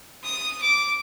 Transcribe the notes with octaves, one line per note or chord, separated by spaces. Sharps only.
D#6
D6